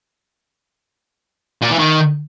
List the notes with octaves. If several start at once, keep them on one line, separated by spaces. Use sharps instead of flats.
A#2
E3
D#3